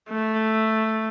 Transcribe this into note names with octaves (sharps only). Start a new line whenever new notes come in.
A3